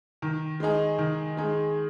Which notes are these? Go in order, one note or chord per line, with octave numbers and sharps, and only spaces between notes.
D#3
G#3 D#4 G#4
D#3
G#3 D#4 G#4